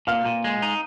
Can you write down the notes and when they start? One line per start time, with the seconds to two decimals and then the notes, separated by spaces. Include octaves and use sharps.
0.07 A#2 F5 F6
0.25 A#2
0.44 G#3
0.62 D#4